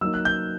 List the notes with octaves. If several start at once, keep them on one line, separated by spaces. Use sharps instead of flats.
F#3 A#3 D#4 E6
F#6
G6